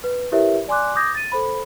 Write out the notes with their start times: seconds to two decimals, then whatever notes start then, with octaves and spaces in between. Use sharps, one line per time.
0.04 B4
0.32 E4 G4 A#4 B4 C#5 E5
0.68 D5 G#5 C6 D6 F#6
0.95 D6 D#6 G6 G#6 A#6
1.15 A6 D#7
1.32 A4 C5 B5